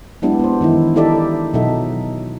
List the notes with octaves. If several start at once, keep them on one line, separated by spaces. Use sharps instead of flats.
F#3 G#3 B3 D4 E4 G4
B3 C5
D#3 E3 D#4 E4
D#4 E4 G4 A4 D5 E5
B2 F#3 D#4 A4 E5